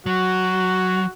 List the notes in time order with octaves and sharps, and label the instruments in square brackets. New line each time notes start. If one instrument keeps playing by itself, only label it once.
[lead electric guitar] F#3 [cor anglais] F#4